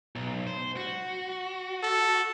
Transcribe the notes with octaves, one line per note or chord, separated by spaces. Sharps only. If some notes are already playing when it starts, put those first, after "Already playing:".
B1
C5
F#4
A4